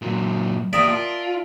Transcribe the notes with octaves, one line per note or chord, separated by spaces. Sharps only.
A#2 F#3
A#3 G4 A#4 D5 E5 D#6
F4 A5